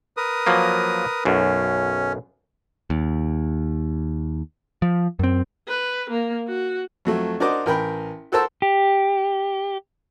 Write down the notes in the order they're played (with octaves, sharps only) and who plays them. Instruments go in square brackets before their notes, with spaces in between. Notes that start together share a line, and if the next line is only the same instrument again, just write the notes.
[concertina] A#4 B4 D#6
[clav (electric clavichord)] F3 F#3 A#3
[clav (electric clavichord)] B1 F#2 [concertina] C#4
[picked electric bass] D#2
F3
F#2 C4
[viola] B4
A#3
F#4
[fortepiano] F2 F#3 A3
D4 F#4 A#4 C5 D#5 D6
A1 A#4 G5 B5
F#4 A4 A#4 C5 A5 E6
[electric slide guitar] G4